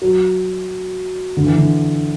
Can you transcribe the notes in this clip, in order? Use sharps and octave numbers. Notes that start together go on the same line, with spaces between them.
F#3
D3
E3
D3